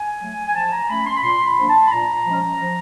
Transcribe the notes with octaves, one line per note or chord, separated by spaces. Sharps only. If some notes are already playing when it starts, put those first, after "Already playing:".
Already playing: G#5
F#3 A3
G#5
F3 A5
A#5
A3 C#4 B5
C6
B5
A#2 C6
B5
F3 A#3 D4
A5
B5
A#2 A#5
F3 G#3 C#4
F3